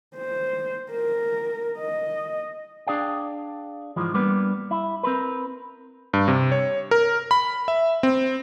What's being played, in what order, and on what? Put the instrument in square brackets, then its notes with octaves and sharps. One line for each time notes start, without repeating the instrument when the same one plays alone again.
[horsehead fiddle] C5
A#4
D#5
[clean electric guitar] D4 G#4 D5 F5 G5
G#2 E3 F3 G#3
G3 A#3 B3 D4 B4
E4
C4 A#4 B4
[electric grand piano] G2
C3
C#5
A#4
B5
E5
C4